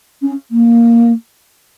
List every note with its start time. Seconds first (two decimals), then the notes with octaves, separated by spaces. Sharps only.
0.22 C#4
0.51 A#3